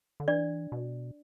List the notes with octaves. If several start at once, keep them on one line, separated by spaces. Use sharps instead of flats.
D3
E3 D4 D5
B2